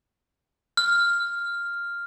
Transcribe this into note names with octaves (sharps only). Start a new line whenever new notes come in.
F6